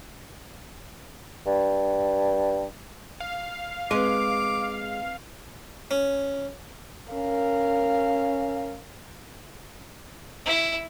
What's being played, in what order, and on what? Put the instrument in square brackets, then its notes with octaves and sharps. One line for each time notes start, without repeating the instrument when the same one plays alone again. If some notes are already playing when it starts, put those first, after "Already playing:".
[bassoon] G2
[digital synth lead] F5
[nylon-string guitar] G#3 [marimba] C4 B4 [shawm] D6
[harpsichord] C#4
[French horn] C#4 [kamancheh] A#4 F5
[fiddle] E4